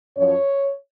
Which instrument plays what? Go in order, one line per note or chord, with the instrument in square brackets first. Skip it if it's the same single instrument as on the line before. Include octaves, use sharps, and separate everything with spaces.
[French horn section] F#2 F3 C#5